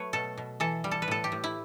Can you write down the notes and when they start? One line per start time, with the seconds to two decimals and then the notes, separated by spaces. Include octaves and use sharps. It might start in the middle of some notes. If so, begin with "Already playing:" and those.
Already playing: F#3 A3 B4 C#5
0.13 B2 A4
0.38 B2
0.60 E3 A4
0.84 G3
0.91 A4
1.02 B4
1.08 A2 A4
1.24 G4
1.32 A2
1.44 E4